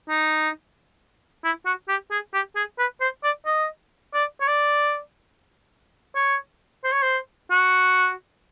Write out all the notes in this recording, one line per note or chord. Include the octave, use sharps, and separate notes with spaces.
D#4
E4
F#4
G4
G#4
G4
G#4
B4
C5
D5
D#5
D5
C#5
D5
C#5
C5
C#5
C5
F#4